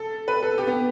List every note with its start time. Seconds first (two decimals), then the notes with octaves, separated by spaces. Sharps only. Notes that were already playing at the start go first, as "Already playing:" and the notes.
Already playing: A4
0.28 B4
0.43 A4
0.58 G4
0.67 B3